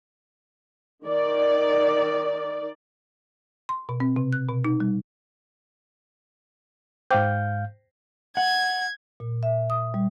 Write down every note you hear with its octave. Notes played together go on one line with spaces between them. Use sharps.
D#3 D5
C6
B2
C4
C3
F#6
B2
D#4
G3
G#2 C5 F5 G5 D6 G6
F#5 G#6
A#2
E5
D#6
G3